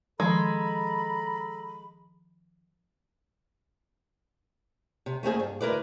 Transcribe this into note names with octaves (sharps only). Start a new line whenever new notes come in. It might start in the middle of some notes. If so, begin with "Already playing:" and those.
D#3 F3 G#3 A4 A#5 B5
C3
A3 A#3 C4 G#4
G2
D2 E4 A#4 B4 D5